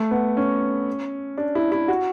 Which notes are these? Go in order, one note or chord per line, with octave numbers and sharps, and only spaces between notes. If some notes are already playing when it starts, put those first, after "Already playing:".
Already playing: A3
B3
C#4
D4
E4
E4
F#4